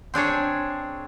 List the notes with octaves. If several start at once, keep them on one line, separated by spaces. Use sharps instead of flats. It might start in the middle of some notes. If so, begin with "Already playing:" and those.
C4 D4 G#4 C#5